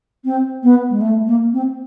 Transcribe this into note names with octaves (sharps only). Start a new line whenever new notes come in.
C4
B3
G#3
A3
A#3
C4